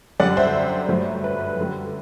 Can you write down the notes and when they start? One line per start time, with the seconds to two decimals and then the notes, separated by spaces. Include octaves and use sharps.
0.20 F#2 D3 G3 D5 F#5
0.37 C5 E5
0.89 G2 F#3 A3
1.24 B4
1.58 F#2 D3 G3